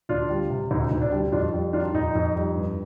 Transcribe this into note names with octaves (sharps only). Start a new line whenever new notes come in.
D2 D4 F4
G3
C3
D2 D#4
D2
D4
G3
F2 D4 F4
G3
D#3 D4 F4
F2 D#4
F2
G3
G2